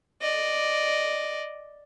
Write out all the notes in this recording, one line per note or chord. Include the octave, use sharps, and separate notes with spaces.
D5 D#5